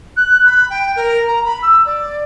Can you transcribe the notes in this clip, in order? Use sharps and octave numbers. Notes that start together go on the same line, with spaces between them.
F#6
B5
G5
A#4
A#5
B5
E6
D5